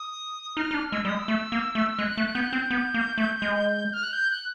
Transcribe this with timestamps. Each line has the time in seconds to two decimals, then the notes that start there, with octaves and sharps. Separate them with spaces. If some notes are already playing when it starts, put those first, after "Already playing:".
Already playing: D#6
0.56 D#4 F6
0.71 D#4
0.74 D4
0.92 G#3 E6
1.05 G3 G#3 D#6
1.19 E6
1.28 A3
1.52 A#3
1.75 A3
1.99 G#3 F#6
2.17 A3
2.35 B3 G6
2.43 F#6
2.50 C4 G6
2.71 B3
2.94 A#3
3.18 A3
3.42 G#3
3.93 F6
4.03 F#6
4.13 G6
4.31 F#6